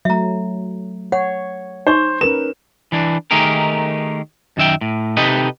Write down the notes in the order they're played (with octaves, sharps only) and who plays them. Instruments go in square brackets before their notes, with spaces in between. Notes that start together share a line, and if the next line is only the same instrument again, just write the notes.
[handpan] F#3 A3 [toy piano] E5 A#5
[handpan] C#5 [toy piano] F#5
[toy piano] D#4 C#6 [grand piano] C5
[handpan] C#4 A#4 B4 [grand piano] E7
[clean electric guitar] E3 D4
D#3 A3 D#4 G4 G#4 A#4
F#2 D#3 E5 G5
A2
C3 D#4 G4 A4 B4 D#5